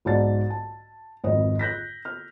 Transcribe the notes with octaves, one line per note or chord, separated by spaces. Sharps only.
B1 G#2 D5 A5 A6
A5
G#1 F2 B4 D#5
F#6 G6 A#6 B6
F6